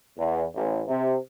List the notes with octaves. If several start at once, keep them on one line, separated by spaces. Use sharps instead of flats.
E2
A1
C3